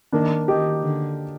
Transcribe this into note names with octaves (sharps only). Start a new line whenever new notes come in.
D#3 A#3 D4
D#3 D#4 G4
D3